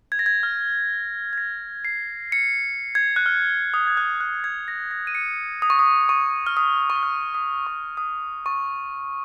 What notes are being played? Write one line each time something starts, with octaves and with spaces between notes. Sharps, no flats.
G#6
A#6
G#6
F6
G#6
A#6
C7
C#7
G#6
F#6
F6
D#6
G#6
F#6
F#6
G#6
A#6
A#6
D#7
C#7
D#6
C#6
D#6
C#6
F6
D#6
C#6
D#6
F6
D#6
C#6
D#6
C#6